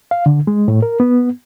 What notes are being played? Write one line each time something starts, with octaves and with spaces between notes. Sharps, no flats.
F5
D3
G#3
A2
A#4
B3